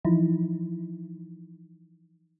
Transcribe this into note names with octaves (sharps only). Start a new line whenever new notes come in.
E3 F3 D#4 E4